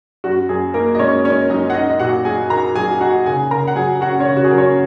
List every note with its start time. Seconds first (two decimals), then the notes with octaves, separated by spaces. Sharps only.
0.24 F#2 F#4
0.49 F#2 G#4
0.74 A#3 D#4 A#4
0.95 D#5
0.99 G#3 C#4 C#5
1.25 C#4 D#4 C#5
1.50 F#2 D#4 D#5
1.70 F#5
1.74 D#4 D#5
1.90 D#5
2.00 A#2 F#4 F#5
2.25 F#3 G#4 G#5
2.50 D#4 A#4 A#5
2.76 F#3 G#4 G#5
3.00 D#4 F#4 F#5
3.26 C#3 G#4 G#5
3.50 C#3 A#4 A#5
3.68 F#5
3.76 F#3 G#4 G#5
4.01 C#4 F#4 F#5
4.20 C#4 C#5
4.27 C#3
4.37 F#4
4.44 G#4
4.51 F#3 A#4
4.58 C#4 C#5